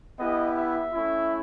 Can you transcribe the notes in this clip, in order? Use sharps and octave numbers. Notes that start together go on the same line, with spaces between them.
B3 E4 G4 D#5
E5
A3 C#4 E4